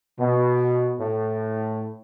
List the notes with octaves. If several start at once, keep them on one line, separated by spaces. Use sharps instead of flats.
B2
A2